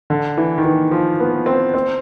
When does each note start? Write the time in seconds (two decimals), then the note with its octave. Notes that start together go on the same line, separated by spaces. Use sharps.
0.10 D3
0.37 E3
0.58 D#3
0.64 E3
0.91 F3
1.20 B3
1.46 C4
1.74 C4